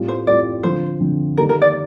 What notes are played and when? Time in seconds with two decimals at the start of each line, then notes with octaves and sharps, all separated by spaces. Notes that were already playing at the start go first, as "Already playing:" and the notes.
Already playing: A2 G3 C4 F4
0.08 C5
0.27 A2 G3 C4 F4 D5
0.63 D3 F3 C4 F4 C5
1.00 D3 F3 C4 F4
1.37 D#3 G3 A#3 A#4
1.49 A#4
1.62 D5